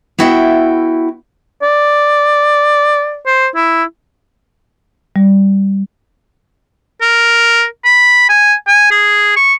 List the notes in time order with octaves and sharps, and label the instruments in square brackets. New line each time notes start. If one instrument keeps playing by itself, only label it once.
[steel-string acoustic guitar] B3 E4 F#4 E5 F#5 G5
[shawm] D5
C5
E4
[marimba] G3
[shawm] A#4
B5
G#5
G#5
G#4
C#6